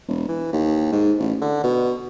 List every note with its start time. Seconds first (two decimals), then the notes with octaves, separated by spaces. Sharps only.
0.08 E1
0.29 E3
0.53 D#2
0.92 G#2
1.20 A1
1.42 D3
1.64 B2